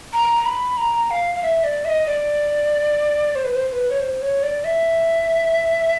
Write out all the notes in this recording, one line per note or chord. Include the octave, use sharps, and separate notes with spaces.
A#5
A#5
B5
A#5
F5
F5
E5
D5
E5
D#5
D5
C5
B4
C5
C5
B4
C#5
C5
C#5
D5
E5